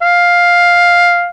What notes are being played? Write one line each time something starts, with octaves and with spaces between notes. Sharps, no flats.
F5